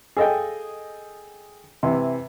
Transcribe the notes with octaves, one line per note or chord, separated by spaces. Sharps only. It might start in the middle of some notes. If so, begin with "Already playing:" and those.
G#4 A4 D#5 F5 G5
C3 E3